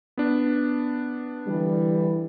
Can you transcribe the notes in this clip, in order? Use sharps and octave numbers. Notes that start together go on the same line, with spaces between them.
B3 D4
D3 E3 G3